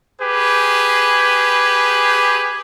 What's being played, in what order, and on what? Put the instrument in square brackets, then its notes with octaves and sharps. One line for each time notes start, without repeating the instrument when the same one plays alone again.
[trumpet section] G4 G#4 B4